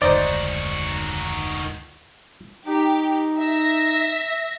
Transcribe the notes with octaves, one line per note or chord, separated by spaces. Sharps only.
F1 D2 G#2 D#3 D#4 F#4 C5 D5
D#4 G4
E5 A#6